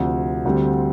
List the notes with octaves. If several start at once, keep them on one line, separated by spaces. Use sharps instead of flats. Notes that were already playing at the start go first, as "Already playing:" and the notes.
Already playing: D2 C3 F3
D2 D3 G3 C4